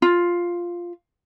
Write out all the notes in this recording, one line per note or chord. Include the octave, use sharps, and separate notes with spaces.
F4